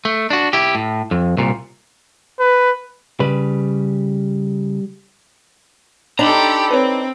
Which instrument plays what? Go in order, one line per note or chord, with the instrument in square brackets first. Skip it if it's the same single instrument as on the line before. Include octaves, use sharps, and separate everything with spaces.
[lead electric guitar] A3
D4 F#4
E4 G4
A2
F2
C2 A#2
[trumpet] B4
[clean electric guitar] C#3 [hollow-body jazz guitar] G3 B4
[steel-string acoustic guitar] D4 D#4 [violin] G4 A4 [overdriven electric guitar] A#5 B5
[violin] C4 [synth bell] B4 C#5